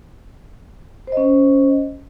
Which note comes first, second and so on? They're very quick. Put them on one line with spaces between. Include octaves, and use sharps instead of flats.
C5 D#5 C#4